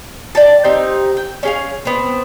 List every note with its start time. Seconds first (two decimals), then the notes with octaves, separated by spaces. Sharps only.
0.35 D5 G5 A5
0.64 C4 D#4 G4
1.17 G5
1.43 C#4 G#4 F5
1.85 B3 C4